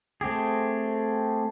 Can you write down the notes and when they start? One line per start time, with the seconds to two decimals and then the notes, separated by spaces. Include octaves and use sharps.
0.21 A3 C4 G4 G#4